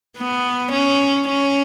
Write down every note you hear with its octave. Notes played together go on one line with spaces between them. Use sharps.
B3
C#4
C#4